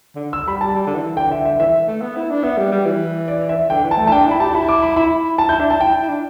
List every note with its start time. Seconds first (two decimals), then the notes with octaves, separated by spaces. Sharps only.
0.15 D3
0.33 E6
0.47 G3 B5
0.61 G3 A5
0.75 G3
0.86 D3
0.96 E3
1.17 D3 G5
1.31 E5
1.45 E5
1.59 E3 E5
1.88 A3
2.02 B3
2.17 E4
2.30 D4
2.43 B3 E5
2.57 G3
2.72 G3
2.86 E3
3.28 D5
3.49 E5
3.70 D3 G5
3.84 E3
3.91 A5
3.98 A3
4.07 A5
4.12 D4 G5
4.26 E4 B5
4.40 G4 A5
4.54 E4 B5
4.69 D6
4.82 B5
4.96 E4 B5
5.25 E4
5.38 E4 A5
5.49 E4 G6
5.60 D4 E5
5.70 E4 A5
5.81 E4 G5
6.02 E4
6.09 D4